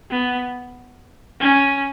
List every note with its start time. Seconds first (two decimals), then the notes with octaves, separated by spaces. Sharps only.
0.11 B3
1.40 C#4